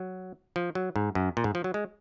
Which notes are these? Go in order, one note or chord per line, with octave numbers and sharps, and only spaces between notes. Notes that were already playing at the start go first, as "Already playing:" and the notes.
Already playing: F#3
F3
F#3
G#2
F#2
A#2
G#2
F3
F#3
G#3